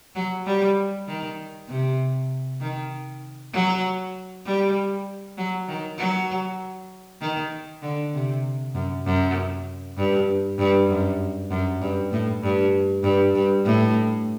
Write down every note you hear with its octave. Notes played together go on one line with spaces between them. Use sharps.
F#3
G3
D#3
C3
D#3
F#3
G3
F#3
D#3
F#3
D#3
D3
C3
F#2
F#2
G2
G2
F#2
F#2
G2
A2
G2
G2
G2
A2